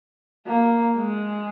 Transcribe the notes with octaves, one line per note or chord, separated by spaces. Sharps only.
A#3
G#3